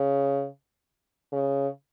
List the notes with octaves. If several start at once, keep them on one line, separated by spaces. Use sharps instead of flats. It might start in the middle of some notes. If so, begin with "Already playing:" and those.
Already playing: C#3
C#3